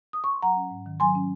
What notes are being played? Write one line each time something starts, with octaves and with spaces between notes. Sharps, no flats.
D#6
C#6
C6
F#3 F#5 A#5
C#4
G#2
D#3
F#3 G#5 C6
C#4